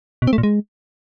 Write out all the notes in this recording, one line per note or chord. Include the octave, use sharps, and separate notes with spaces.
B2
C4
A3
A#2
G#3